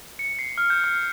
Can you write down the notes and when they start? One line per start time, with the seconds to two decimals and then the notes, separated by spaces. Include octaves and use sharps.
0.19 C#7
0.39 C7
0.58 F6
0.70 G6
0.84 F6